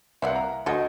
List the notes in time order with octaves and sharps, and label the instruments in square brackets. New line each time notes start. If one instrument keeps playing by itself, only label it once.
[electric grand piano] C2 F#5 [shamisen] A#3 D5 E5
[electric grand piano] A#5
[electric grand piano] D2 D#5 [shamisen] F#4 A4